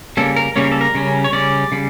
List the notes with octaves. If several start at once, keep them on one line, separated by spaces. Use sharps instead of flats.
C#3 G3 A#3 C#4 A4
A#4
C#3 G3 A#3 C#4 C#5
A#4
A4
A#4
C#3 G3 C#4
C#5
C#3 G3 C#4 D5
C#3 G3